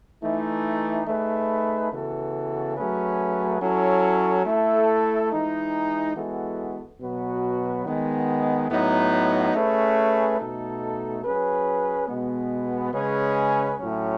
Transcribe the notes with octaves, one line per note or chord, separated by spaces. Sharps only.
E3 A3 D#4
A3 D#4 G#4 B4
C#3 E3 B3 F#4 A4
F#3 A3 C#4 G#4 B4
F#3 C#4 E4 A4
A3 E4 A4
E3 G#3 D#4
E3 G#3 B3 F#4 A4
B2 F#3 B3 F#4 B4
D#3 G#3 B3
A2 F#3 B3 D#4
A3 C#4 G#4 B4
B2 A3 D#4 A4
F#3 C#4 G#4 B4
B2 G#3 B3
C#3 G#3 C#4 G#4 B4
A2 F#3 C#4